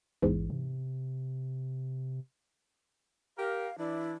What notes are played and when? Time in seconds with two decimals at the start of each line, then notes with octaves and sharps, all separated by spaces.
0.22 A1 E2 G#2
0.50 C3
3.38 G4 A#4 F5
3.78 E3 D4 E4